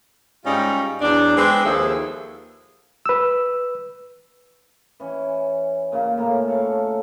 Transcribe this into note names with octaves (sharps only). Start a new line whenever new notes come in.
G#2 G3 C#4 D#4 F4
E2 F#3 D4
G#3 C4 D4 B4
D#2 F3 G#4 A4 E5
B4 E6
E3 C#4
A#2 C#3 A#3 C#4
A2 A#3 A#4
A4 C#5 F5